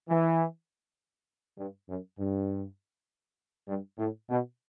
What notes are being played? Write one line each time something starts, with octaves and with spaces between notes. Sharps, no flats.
E3
G2
F#2
G2
G2
A2
B2